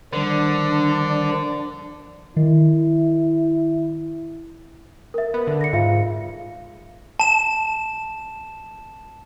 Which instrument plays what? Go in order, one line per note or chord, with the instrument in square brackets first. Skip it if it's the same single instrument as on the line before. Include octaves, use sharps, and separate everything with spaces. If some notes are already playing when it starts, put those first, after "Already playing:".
[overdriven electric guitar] D3 [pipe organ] D#3 F3 G3 [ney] D4
[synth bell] D#3 [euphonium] E4
[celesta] A#4 E5
[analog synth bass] B3
D3
[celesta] A#6 C#7
[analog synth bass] G#2 [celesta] F4 E5 F5
[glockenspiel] A5 E7